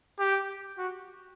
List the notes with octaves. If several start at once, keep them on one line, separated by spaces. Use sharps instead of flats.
G4
F#4